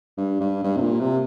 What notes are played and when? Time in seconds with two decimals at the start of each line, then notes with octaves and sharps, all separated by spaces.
0.18 G2
0.41 G2
0.64 G2
0.77 C3
0.82 A#2
1.00 C3